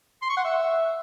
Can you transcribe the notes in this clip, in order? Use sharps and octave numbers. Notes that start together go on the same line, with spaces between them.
C6
C#6
F#5
E5